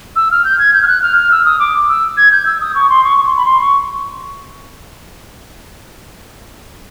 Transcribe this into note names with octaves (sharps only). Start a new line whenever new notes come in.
E6
F6
G6
G#6
G6
F6
F#6
F6
F6
E6
D#6
D6
E6
G#6
G6
E6
D#6
C#6
C6
C#6
C#6
C6
B5
C6
C#6